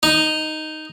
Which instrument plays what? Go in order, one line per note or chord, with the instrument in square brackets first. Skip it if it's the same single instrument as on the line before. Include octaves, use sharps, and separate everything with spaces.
[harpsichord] D#4